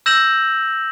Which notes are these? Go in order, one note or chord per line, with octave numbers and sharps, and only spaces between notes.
E6 G6 A#6 E7 F#7